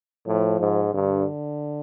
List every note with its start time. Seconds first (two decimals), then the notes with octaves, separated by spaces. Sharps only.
0.27 A2 F3
0.60 G#2
0.94 G2 D3